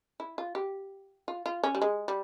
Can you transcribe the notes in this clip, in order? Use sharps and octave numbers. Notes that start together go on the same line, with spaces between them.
E4
F4
G4
F4
F4
C#4
G3
G#3
G3